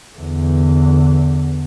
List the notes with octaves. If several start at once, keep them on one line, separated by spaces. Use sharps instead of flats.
E2 D3